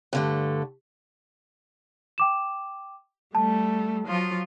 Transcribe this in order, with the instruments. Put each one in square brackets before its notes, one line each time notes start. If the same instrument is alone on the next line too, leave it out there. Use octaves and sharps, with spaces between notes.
[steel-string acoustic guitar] G2 D3 A3
[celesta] G5 D6 E7
[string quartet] G3 A3 [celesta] A5
[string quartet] F3 F#3 F4